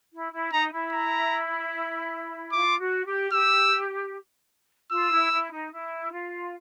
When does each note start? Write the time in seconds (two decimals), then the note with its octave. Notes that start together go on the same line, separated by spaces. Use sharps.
0.13 E4
0.32 E4
0.51 D#4 A#5
0.71 E4
0.92 A#5
2.52 F4 D6
2.78 F#4
3.05 G4
3.32 G4 E6
4.91 F4 E6
5.12 E4
5.31 E4
5.52 D#4
5.72 E4
6.12 F4